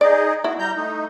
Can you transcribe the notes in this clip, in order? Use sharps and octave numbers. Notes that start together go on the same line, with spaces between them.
D#4 G#4 D5 D#5
E4 F#4
G3 A#5 G6
A3 D#4